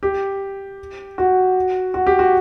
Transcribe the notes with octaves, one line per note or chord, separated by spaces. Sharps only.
G4
F#4
F#4
G4
F#4